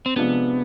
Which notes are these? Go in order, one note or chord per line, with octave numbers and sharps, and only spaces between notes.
C4
C3 F3 G#3 B3 D4